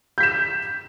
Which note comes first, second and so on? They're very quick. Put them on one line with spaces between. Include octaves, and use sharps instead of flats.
G6 B6 E7